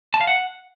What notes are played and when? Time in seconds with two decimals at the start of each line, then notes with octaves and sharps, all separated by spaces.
0.14 A5
0.21 F5
0.27 F#5